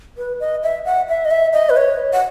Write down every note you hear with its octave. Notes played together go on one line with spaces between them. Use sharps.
B4
D#5
E5
F#5
E5
D#5
E5
D#5
B4
C#5
F#5